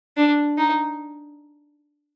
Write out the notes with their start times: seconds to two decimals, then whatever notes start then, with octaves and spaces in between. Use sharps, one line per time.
0.17 D4
0.58 D#4